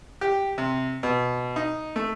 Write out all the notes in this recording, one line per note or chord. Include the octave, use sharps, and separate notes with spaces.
G4
C3
B2
D#4
A3